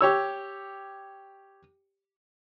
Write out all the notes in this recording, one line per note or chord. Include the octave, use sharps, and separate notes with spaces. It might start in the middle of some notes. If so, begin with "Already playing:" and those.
G4 C#5 E6